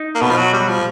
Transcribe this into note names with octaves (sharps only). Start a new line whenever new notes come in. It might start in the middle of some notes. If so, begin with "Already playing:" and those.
Already playing: D#4
A#3
B2 B3
F3
F#3
F#3 G3
F3